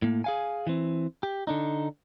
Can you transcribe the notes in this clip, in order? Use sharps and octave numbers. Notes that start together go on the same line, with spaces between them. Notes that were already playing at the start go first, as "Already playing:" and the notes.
A2 A#3
G#4 F5 G#5
E3 C4
G4
D3 D4 D#4